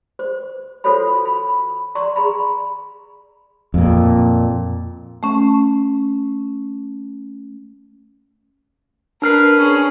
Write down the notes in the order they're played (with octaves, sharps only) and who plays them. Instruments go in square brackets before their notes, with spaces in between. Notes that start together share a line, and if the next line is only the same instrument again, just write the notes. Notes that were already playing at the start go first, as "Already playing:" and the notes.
[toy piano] C5
F4 F#4 A4 C5 C#5 B5
B5
D5 A#5 C6 C#6
G#4 A#5 B5
[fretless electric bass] F2 A#2
[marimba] A3 C#4
[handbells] D4 F6 C7 [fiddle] A#4 B4
[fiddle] C#4 G#4